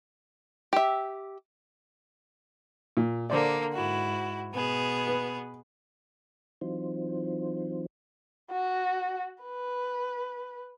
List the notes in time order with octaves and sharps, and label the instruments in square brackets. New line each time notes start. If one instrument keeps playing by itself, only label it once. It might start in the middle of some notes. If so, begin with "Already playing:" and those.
[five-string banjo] G4 E5
[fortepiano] A#2
[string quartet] D3 A#3 [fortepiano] C5 D5
[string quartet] G#2 E4 F#4
B2 B3 G#4
[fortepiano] B4
[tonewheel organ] E3 F#3 C4 D#4 F4 C5
[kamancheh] F#4
B4